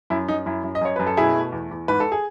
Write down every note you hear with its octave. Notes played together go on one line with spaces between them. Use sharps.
F#2 E4
F#2 D#4
F#2 E4
F#2
D#5
F#2 C#5
F#2 B4
A4
B2 E4 G#4
A3
E2
E2
G#2 B4
A4
G#4